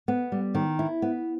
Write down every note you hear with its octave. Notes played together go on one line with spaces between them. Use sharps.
B3
G3
D#3
E4
B3